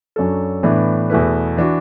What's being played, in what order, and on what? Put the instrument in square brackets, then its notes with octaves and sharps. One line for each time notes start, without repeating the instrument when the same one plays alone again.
[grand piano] F#2 F#3 D4 A4
A2 E3 B3 D4
E2 B2 A3 E4 B4
E3 D4 F#4